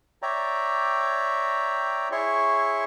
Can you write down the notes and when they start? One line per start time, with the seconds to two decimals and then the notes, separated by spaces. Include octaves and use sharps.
0.22 C#5 D5 E5 G5 A#5
2.12 E4 G#4 C#5 E5 C6 C#6